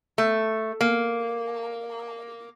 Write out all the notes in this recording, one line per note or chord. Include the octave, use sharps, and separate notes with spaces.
A3
A#3